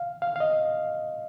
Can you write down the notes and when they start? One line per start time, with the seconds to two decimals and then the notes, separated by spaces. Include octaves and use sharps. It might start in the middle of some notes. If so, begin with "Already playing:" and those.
Already playing: F5
0.22 F5
0.36 F5
0.40 D#5